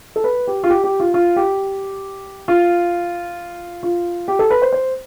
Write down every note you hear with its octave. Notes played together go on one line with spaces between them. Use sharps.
A4
B4
G4
F4
G4
G4
F4
F4
G4
F4
F4
G4
A4
B4
C5
C5